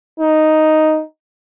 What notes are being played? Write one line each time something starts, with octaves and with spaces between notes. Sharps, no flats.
D#4